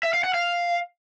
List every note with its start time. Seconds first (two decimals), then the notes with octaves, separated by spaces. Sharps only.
0.03 E5
0.14 F5
0.24 F#5
0.34 F5